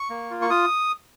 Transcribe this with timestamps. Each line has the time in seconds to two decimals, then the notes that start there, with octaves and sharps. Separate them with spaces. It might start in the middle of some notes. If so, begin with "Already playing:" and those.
Already playing: C#6
0.10 A#3
0.31 F4
0.42 C#6
0.50 F4 D#6